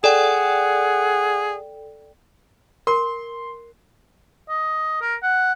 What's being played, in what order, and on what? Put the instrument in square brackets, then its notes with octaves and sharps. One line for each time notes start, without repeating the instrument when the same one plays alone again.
[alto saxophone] G#4 [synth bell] A4 D5 G5 [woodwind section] F#5
[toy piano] A#4 [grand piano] C6
[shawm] D#5
A#4
F#5